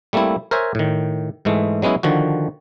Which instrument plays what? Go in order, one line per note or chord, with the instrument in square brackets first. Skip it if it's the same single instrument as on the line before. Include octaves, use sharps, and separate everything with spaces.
[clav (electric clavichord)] G3 A3 A#3 C4 E4
A#4 C5 C#5 E5 G#5
A2 D#3
G#2 E3 G#3 A3
F#3 G#3 B3 C#4 E4
D3 D#3 F3 F#4